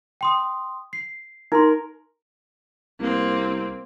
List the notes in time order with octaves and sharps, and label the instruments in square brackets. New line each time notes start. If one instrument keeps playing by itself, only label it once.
[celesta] G5 C6 D#6
C7
[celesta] D#4 C6 [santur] A#4
[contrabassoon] C2 [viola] A#3 C4